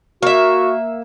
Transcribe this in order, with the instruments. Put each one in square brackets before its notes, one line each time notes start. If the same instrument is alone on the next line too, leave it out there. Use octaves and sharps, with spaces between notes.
[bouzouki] A#3 E5 [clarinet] F#4